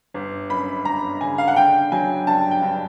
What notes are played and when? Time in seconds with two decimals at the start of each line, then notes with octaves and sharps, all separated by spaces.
0.14 G1
0.50 F#2 B5
0.85 G1 A#5
1.21 C#3 G#5
1.38 F5
1.48 F#5
1.56 D3 G5
1.92 F#3 G#5
2.27 G2 A5
2.51 G5
2.62 G2